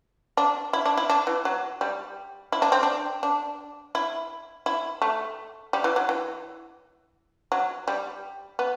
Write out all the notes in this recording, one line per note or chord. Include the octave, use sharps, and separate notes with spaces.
D4
E4
D4
E4
D4
E3
F#3
G3
E4
D4
C4
D4
D4
E4
E4
A3
G3
E3
F#3
E3
F#3
G3
B3